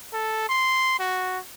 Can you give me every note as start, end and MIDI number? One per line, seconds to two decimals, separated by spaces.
0.14 0.45 69
0.49 0.96 84
1.00 1.39 66